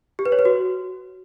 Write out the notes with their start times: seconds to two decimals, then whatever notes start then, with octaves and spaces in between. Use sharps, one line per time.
0.19 G4
0.25 B4
0.32 C#5
0.39 B4
0.45 F#4